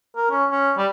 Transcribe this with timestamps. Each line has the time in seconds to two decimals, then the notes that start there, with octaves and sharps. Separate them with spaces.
0.16 A#4
0.31 C#4
0.51 C#4
0.78 G3